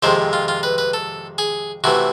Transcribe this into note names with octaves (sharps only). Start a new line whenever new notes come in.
F2 C3 D#3 G#3 C5
F4
F4
B4
B4
A4
G#4
C3 E3 A3 F#4